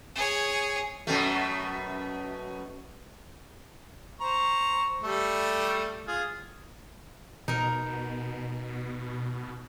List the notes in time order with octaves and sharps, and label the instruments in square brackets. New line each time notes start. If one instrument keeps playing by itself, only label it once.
[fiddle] G#4 C#5
[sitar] F#2 B2 A3
[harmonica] C5 A#5 C#6
G3 A3 A4
F4 G#4
[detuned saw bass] B2 [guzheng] D#4 A#4